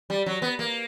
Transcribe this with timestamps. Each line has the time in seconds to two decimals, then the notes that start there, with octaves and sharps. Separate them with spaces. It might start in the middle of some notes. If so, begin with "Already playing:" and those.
0.10 G3
0.26 F#3
0.42 B3
0.59 A#3